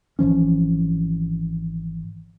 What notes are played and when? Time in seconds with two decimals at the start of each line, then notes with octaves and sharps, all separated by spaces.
0.19 G#1 E3 F3 C#4